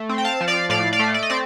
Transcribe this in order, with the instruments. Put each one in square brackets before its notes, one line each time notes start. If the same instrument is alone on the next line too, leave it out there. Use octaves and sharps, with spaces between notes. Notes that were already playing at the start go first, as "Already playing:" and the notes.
Already playing: [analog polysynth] A3
C4
G5
F5 A5
F3
D5 F5
A2 D5 F5
D5 F5
A3
D5
D#5
C4 D5